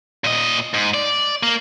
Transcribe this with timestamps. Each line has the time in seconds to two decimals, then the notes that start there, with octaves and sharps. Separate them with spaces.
0.24 A#2 D#5
0.74 G#2
0.94 D5
1.43 A#3